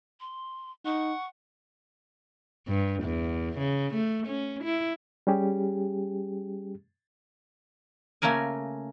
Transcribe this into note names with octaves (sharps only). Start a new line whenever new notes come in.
C6
D#4 F#5 C#6
G2
E2
C#3
A3
C#4
E4
G3 C#4 G4 G#4
C#3 A3 A#3 C#4 A#4 G#5